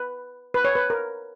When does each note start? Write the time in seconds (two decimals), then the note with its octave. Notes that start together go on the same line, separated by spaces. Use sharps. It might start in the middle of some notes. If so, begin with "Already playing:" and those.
Already playing: B4
0.54 B4
0.65 C#5
0.75 B4
0.90 A#4